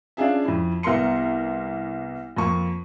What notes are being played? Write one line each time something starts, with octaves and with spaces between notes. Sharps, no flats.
C#4 D4 F4 G#4 E5
F2 E4
C2 B3 A#4 C6 C#7
F2 A#3 C#6